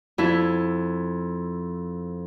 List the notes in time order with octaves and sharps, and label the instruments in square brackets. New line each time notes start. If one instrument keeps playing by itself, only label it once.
[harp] F2 E4